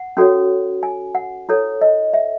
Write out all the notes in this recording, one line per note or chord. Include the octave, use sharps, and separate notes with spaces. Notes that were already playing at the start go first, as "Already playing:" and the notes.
Already playing: F#5
C#4 F#4 A4 C#5
G#5
F#5
E4 A4 C#5
D#5
E5